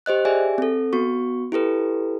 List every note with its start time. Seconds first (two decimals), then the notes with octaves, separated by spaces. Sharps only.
0.06 G4 C5 D#5 F#6
0.25 G4 G#4 D5 E5 G#5
0.58 C4 A4
0.93 B3 F#4 C#6
1.52 E4 G4 A4 B4